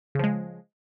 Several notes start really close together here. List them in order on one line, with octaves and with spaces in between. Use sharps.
C#3 F3 G#3